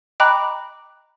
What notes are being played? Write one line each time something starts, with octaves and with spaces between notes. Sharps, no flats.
D#5 G5 A#5 B5 D6 F#6